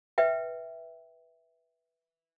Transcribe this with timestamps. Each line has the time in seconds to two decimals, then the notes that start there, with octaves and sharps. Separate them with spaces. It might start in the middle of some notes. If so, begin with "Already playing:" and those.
0.18 B4 E5 G5